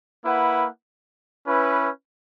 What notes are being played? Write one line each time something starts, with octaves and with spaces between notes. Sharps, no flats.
A#3 E4 B4 F#5
C#4 E4 B4